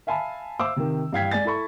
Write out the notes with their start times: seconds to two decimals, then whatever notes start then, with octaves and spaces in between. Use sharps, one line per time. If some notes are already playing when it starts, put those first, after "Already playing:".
0.07 E5 F5 G#5 A5 B5
0.59 C5 E5 F5 D6 E6
0.76 C3 D#3
1.13 G2 E3 F5 G5 G#6 B6
1.31 G#3 D5 G#5 A6
1.45 E4 A4 B5 C#6